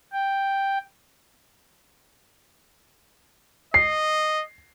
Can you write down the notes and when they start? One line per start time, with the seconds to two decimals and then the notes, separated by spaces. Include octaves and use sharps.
0.12 G5
3.74 D#5 C7